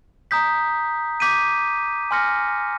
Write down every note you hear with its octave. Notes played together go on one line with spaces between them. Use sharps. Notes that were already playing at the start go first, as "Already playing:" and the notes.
A#5 D#6 G6 B6
D6 G6 B6 D#7
G#5 C6 F6 A#6 C#7